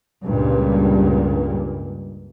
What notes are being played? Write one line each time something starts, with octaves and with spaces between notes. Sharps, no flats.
C#2 G2 A#2